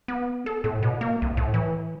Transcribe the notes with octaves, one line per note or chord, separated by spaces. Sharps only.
B3
A4
A2
B2
A#3
C2
A2
E3